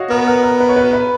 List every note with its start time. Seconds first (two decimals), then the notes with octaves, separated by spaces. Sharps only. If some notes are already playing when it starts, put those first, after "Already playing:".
Already playing: F#4 C#5 D#5 F5
0.10 B3 A#4
0.27 A#4
0.43 A#4
0.60 B4
0.69 C#5
0.76 B4
0.93 B4